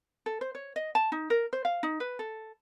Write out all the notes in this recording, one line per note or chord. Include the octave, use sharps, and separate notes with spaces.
A4
C5
C#5
D#5
A5
D#4
A#4
C5
F5
D#4
B4
A4